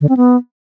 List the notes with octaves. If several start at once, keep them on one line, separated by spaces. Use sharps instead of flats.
D3
C4
B3